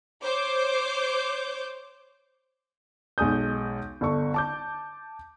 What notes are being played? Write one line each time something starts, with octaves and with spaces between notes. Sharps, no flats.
C5 C#5 D6 G6
B1 G#3 G#5 D#6 G6
G1 A4 C#6
A5 D6 G6